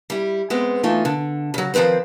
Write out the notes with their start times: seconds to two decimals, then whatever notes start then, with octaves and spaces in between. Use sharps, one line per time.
0.10 G3 E4
0.50 G#3 B3 C4
0.83 E3 A3 D#4 F4
1.05 D3
1.54 C#3 F#3
1.74 D#3 F3 C4 B4 C5